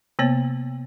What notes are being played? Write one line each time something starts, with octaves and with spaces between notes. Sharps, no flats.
C3 A#3 B3 C#5